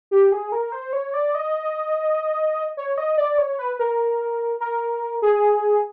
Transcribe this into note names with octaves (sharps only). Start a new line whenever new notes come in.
G4
G#4
A#4
C5
C#5
D5
D#5
C#5
D#5
D5
C#5
B4
A#4
A#4
G#4